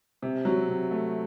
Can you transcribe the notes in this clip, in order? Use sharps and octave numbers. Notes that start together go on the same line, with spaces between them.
C3
F#3
C3
A3